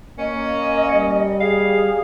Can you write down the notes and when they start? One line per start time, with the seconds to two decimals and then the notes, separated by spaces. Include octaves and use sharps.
0.18 A#3 C#4 D#5
0.92 G3
1.40 G#4 F5